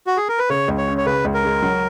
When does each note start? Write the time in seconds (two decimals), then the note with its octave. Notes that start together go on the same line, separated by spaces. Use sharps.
0.07 F#4
0.17 G#4
0.29 A#4
0.39 B4
0.49 C#3 C#5
0.68 C#2
0.78 C#5
0.88 C#4
0.98 C#5
1.06 C#3 B4
1.25 C#2
1.34 A#4
1.44 G#3
1.62 F#3